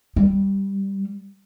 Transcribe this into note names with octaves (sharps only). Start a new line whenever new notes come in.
G3